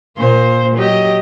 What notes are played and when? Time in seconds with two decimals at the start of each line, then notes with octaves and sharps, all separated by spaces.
0.18 A#2 A#3 C5
0.75 F#3 G4 D#5